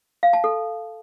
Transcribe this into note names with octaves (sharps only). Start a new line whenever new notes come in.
F5
A5
A4